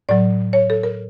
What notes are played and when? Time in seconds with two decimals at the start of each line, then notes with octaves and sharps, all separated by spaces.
0.09 A2 F#3 D5
0.53 C#5
0.70 A4
0.83 A#4